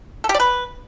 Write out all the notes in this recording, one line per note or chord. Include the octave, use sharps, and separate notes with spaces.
A4
G4
D5
B4